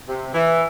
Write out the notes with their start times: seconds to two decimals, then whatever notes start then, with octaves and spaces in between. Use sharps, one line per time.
0.09 C3
0.34 E3